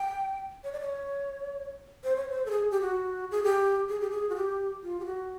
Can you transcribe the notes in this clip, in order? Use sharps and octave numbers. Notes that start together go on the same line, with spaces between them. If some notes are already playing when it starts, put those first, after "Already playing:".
Already playing: G5
C#5
D5
C#5
C5
C#5
C5
A4
G#4
G4
F#4
G#4
G4
G#4
G4
G#4
F#4
G4
F4
G4
F#4